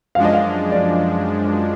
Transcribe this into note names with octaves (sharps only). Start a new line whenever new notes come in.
F#2 F3 G#3 D4 F5
D#5
F5
D5